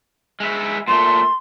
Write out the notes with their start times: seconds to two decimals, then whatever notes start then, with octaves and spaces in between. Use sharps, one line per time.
0.40 G#3 E4
0.88 A#2 A3 C6